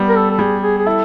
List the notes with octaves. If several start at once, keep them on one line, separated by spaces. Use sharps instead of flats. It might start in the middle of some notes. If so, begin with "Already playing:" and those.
Already playing: G3 B3
A#4
A4
A4
G3 G#4
G#4
G#4
E4 A4